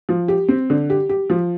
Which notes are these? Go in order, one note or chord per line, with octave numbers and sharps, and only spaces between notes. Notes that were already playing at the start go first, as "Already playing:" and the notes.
F3
G4
C4
D3
G4
G4
F3